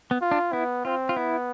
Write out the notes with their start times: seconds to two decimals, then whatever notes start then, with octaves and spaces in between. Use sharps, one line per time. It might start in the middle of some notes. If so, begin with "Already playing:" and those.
0.11 B3
0.21 F4
0.31 D4
0.53 B3 E4
0.85 C4 F4
1.09 F4
1.16 B3 E4